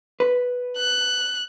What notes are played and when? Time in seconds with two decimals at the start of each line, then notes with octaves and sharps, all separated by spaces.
0.20 B4
0.78 F#6